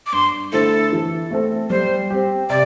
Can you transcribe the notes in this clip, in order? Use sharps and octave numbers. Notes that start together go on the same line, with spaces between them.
D6
G2 C6
D3 A3 E4 A4 C5
E3
A3 C4 A4
G3 C5
C4 G4
C3 D5